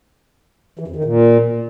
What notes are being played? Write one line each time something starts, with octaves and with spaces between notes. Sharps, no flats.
E3
F2
D#3
A#2